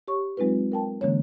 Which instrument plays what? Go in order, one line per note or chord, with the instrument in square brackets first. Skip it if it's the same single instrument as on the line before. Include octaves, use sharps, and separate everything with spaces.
[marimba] G4 C#5 C#6
F#3 G#3 C4 D#4 F4 B4
A#4 G5 A5
D3 E3 G#3 A#3 C#4 C#5